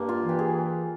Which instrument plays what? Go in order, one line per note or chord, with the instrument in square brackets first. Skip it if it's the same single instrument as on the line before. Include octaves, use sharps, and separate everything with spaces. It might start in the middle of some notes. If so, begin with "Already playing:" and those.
Already playing: [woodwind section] G2 [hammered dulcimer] A#3
[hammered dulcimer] F4
[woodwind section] E3
[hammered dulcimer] G4
G#4